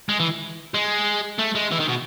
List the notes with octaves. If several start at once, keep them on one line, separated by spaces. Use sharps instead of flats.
G#3
E3
G#3
A3
G#3
E3
D#3
B2